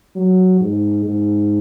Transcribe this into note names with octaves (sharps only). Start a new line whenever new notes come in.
F#3
G#2
G#2